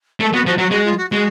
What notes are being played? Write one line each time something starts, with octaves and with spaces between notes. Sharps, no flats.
A3 A4
B3 F#4
F3 F#4
F#3 F#4
G#3 F#4
F4
F#4
G#3 F#4